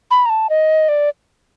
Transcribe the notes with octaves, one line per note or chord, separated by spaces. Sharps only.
B5
A#5
A5
D#5
D5